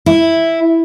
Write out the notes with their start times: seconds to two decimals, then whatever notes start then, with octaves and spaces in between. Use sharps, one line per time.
0.06 E4